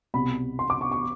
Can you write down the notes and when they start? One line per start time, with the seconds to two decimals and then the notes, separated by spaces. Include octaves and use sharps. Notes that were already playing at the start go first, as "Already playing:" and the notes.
0.14 C2 B2 B5
0.59 C6
0.70 D6
0.81 C#6
0.92 C#6